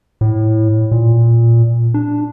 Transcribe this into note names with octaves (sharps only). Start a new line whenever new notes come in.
A2
A#2
D4